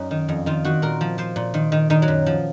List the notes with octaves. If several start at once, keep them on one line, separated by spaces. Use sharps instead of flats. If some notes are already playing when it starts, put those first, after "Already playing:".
Already playing: F#2 C#4 D#4
D#3
F2
D#3 F4
D#3 F#4
A#2 A#4
F3
F3 C5
A#2
D#3
D#3
D#3 D#4
F#3
F#2
F3